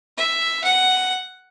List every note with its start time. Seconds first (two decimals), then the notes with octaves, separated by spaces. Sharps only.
0.17 E5
0.64 F#5